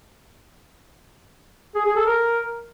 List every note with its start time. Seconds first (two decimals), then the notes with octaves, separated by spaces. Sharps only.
1.75 G#4
1.86 G#4
1.96 A4
2.07 A#4